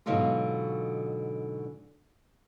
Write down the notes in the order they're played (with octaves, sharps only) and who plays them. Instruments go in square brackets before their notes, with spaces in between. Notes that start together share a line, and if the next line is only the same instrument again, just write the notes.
[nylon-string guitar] G#2 B2 D3 F#3 F4 G4